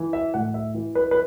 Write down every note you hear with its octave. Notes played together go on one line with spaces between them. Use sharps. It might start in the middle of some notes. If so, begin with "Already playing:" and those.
Already playing: E3
E5
A2 F#5
E5
E3
B4
B4